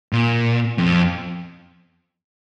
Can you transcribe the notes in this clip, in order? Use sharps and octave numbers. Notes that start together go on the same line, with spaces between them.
A#2
F2